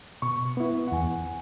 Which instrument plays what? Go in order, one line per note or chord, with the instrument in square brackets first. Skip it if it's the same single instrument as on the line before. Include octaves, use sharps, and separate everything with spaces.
[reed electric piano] B2 [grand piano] C#6
[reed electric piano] B3 E4
[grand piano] F#5
[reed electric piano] E2 [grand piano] G#5